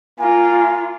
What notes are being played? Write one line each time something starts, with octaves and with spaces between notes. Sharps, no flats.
A#3 F4 G#5